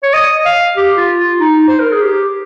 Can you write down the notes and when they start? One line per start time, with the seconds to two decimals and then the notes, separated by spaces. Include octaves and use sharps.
0.03 C#5
0.14 D#5
0.45 F5
0.77 G4
0.97 F4
1.18 F4
1.39 D#4
1.68 C5
1.80 A#4
1.92 G#4
2.02 G4